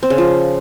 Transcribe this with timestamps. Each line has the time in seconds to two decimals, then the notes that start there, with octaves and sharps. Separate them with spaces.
0.03 C4
0.10 C#3
0.18 F3